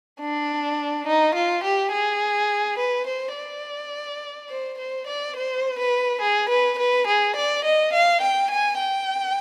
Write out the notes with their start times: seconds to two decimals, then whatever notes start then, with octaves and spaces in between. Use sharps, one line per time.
0.21 D4
1.07 D#4
1.35 F4
1.63 G4
1.92 G#4
2.78 B4
3.07 C5
3.35 D5
4.49 C5
4.78 C5
5.07 D5
5.36 C5
5.79 B4
6.21 G#4
6.50 B4
6.78 B4
7.07 G#4
7.36 D5
7.64 D#5
7.93 F5
8.21 G5
8.50 G#5
8.79 G5